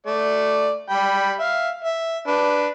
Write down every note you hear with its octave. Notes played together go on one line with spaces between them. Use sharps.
A3 D5
G3 G5 B5
E5 F5
E5
D4 B4